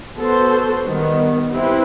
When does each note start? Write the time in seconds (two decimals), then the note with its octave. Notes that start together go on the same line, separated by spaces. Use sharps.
0.17 B3 F#4 A4 C5
0.84 D#3 G3 B3
1.52 C4 E4 G4 B4